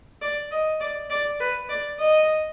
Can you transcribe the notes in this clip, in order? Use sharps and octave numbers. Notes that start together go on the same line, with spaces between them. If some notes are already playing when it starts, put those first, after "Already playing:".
D5
D#5
D5
D5
B4
D5
D#5